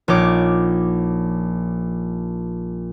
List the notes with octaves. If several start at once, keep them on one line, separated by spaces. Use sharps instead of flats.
A#1 D#4 C#5 D6